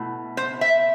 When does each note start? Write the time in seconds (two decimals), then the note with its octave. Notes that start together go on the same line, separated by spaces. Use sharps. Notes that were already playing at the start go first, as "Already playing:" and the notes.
Already playing: B2 A3 E4
0.37 C5
0.61 E5